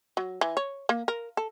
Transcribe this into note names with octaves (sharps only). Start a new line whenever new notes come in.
F#3
E3
C#5
A#3
A#4
A4